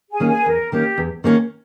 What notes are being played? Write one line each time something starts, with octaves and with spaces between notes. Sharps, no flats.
G#4 G#5
D#3 A#3 C#4
G#4 G#5
B4
E2 A#4
D#3 A#3 C#4 G4
E2
D#3 A#3 C#4